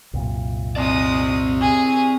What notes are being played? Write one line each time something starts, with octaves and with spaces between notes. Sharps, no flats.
C2 F#2 A#2
G#3 C4 D5 D#6
G#4